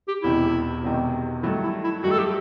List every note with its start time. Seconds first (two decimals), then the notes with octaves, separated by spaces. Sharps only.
0.08 G4
0.23 E1 E2 C3 D#3 E4
0.84 E1 E2 C3 D#3
1.43 G2 D#3 F#3 A3 E4
1.63 E4
1.84 E4
2.03 G2 D#3 F#3 A3 F#4
2.11 A4
2.19 G4